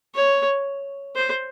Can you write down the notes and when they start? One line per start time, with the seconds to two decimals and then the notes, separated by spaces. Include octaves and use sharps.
0.15 C#5
1.16 C5